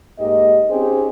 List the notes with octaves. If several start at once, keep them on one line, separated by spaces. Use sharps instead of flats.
G#2 A#3 G4 D#5
C4 C#4 D#4 G4 G#4 C5